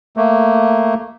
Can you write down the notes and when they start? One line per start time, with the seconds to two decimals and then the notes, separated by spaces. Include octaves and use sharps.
0.17 A3 A#3